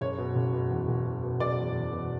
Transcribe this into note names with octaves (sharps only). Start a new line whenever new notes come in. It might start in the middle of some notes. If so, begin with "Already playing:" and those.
F#1 C#5
B2
F#1
B2
E2
F#1
B2
B2
F#1 D5
E2
E2
B2